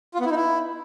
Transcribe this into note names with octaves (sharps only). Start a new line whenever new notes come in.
F4
B3
E4
D#4
E4